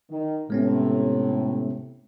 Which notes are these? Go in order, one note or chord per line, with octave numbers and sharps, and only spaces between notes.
D#3
A2 C3 G#3 B3 C#4